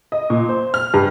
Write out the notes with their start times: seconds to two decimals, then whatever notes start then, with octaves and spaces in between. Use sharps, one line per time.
0.12 D#5
0.30 A#2
0.49 C5
0.74 F6
0.94 G2